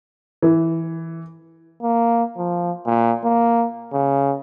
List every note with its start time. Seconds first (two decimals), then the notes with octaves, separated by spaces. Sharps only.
0.42 E3
1.82 A#3
2.37 F3
2.86 A#2
3.24 A#3
3.93 C#3